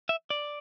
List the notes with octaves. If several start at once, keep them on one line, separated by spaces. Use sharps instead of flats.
E5
D5